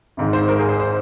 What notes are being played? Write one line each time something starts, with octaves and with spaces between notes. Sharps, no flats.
G#1 G#2 D#3 G#3
C5
A#4
G#4
C5
C5